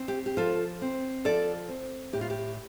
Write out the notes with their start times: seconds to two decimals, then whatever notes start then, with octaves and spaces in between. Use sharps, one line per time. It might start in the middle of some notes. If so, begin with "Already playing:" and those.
Already playing: C4
0.08 G4
0.26 G4
0.37 F3 F4 A4
0.82 C4
1.25 F3 A4 D5
1.68 C4
2.13 A2 G4
2.21 F4
2.30 G4